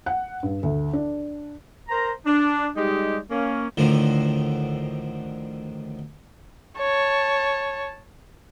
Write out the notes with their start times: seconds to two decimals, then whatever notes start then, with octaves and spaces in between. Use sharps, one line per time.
0.06 F#5
0.43 G2
0.63 D2
0.93 D4
1.89 A#4 C5 A#5
2.26 D4
2.76 G3 G#3 D#4 G4
3.31 A#3 C#4
3.77 D2 A2 D3 D#3 F3
6.78 C#5 A5